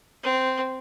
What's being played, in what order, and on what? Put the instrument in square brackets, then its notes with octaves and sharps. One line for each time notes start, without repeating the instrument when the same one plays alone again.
[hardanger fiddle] C4